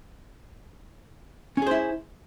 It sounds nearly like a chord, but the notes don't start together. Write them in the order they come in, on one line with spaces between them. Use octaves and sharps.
C#4 G#4 C5 E4